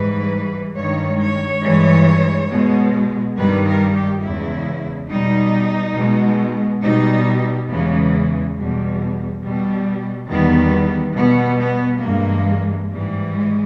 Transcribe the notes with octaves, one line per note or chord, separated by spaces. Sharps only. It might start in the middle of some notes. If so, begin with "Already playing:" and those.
Already playing: G#2 E3 G3 B4
G2 D#3 G#3 C#5
C#5
G2 E3 G#3
B2 G#3
G2 D#3 G3 B4
A#4
G4
E2 C#3 G#3 E4
B2 G3 D#4
B2 G#3
B2 G3 D#4
E2 C#3 E3 G#3 B3
E2 B2 G3
B2 G3
E2 D#3 G3 B3
B2 G3 B3
B3
G2 E3 G#3 A#3
G#2 E3 G3
G#3